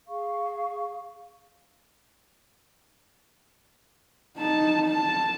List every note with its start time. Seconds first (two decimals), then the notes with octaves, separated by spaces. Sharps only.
0.07 G#4 F5 C#6
4.38 D#4 A5
4.87 A5